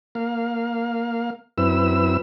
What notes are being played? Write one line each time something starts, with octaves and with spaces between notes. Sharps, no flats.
A#3 F5
F#2 C4 E4 B4 E6